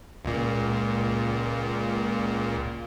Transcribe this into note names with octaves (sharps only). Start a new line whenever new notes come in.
C#2 A#2